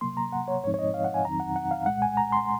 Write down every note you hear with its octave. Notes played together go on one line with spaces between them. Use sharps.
C3 F#3 A#3 C6
A#5
F#5
C#5
G#2 F3 G#3 C4 D#4 C#5
C#5
D#5
F5
F#5
G#5
F2 D#3 F#3 C4 D#4 A#5
F#5
F#5
F5
C2 A#2 G#3 F#5
G#5
A#5
C6